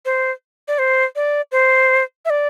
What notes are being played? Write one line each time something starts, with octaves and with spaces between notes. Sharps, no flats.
C5
D5
C5
D5
C5
E5
D5